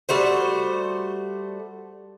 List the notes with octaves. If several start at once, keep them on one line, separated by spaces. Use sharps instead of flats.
G3 A3 F#4 C5